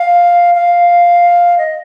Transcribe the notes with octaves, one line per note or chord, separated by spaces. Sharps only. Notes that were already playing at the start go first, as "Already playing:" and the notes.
Already playing: F5
F5
D#5